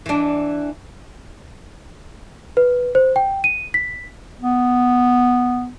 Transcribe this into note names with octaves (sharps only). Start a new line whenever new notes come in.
E3 D4
B4
C5
G5
D#7
B6
B3